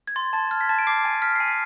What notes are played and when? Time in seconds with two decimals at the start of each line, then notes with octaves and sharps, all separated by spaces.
0.07 G#6
0.16 C6 A6
0.33 A5 A6
0.51 F6 G#6
0.61 B6
0.69 A5 A6
0.79 D7
0.87 D6 C7
1.05 G#5 A6
1.22 F6 B6
1.35 G#5 C7
1.48 B6